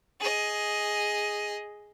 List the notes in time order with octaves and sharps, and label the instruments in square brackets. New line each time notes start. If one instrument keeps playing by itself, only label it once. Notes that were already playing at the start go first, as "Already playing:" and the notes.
[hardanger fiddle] G#4 D#5